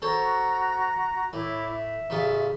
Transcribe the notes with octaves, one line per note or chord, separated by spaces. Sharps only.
F#4 A4 C5 C#5 A#5
A2 E4 C#5 D6
E5
A1 C#3 F4